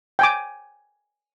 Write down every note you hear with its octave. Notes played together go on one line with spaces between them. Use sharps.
G5 G#5 D6